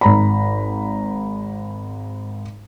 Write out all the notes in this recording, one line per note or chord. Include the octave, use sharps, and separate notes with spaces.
G#1 A#5 B5